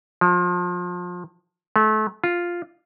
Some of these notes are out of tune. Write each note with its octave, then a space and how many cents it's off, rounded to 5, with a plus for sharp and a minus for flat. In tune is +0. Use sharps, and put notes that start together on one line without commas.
F3 +30
A3 -30
F4 +0